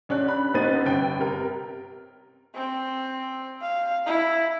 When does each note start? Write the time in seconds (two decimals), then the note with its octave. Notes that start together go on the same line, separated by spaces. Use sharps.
0.09 A1 C#4 D4 F#6
0.28 B5
0.54 A1 B3 C4 D#4 A6 D#7
0.86 G1 G5
1.19 C3 A#4
2.55 C4
3.62 F5
4.06 E4